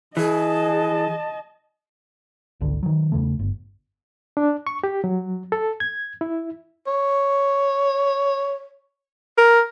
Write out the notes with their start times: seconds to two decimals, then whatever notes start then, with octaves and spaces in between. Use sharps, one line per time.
0.17 E3 G#4 D#5 A5
2.61 G#1 C#2 D3
2.83 D#3 F#3
3.12 E2 C#3 A3
3.39 G1
4.37 D4
4.67 C#6
4.84 G4
5.04 F#3
5.52 A4
5.80 G#6
6.21 E4
6.87 C#5
9.38 A#4